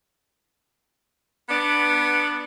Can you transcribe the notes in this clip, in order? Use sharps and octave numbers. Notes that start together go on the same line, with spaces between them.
B3 D4